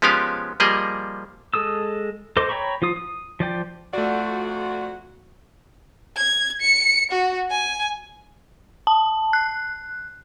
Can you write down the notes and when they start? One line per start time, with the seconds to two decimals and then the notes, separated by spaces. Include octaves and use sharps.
0.02 F3 G#3 B3 C#4 G4 F5
0.60 F3 G3 A#3 G#4 D#5
1.54 G#3 A4 D#6 E6
2.37 A4 C5 D#5 C6 D6
2.49 C#5 G5 A#5 B5 C#6
2.82 F3 F4 D#6
2.96 D#6
3.40 F3 D5 G5
3.93 F2 A3 F4 F#4 D5
6.16 G#6
6.61 C#7
7.11 F#4
7.50 G#5
8.87 A5
9.33 F#6